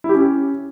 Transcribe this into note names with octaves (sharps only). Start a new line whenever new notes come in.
E4
G4
C#4